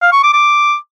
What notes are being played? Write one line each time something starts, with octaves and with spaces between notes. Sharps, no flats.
F5
C#6
D6
D6